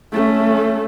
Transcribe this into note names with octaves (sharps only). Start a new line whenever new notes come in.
A3 C#4